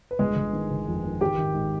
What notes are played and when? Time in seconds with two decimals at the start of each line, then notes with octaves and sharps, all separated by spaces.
0.11 B4
0.19 G1 G#3 G#4
0.36 G1
0.53 D#3
0.71 G1
0.87 F2
1.04 D#3
1.21 G#1 G4 G5
1.38 G#1
1.54 G#2